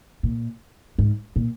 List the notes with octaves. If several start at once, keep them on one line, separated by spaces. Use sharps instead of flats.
A#2
G#2
A#2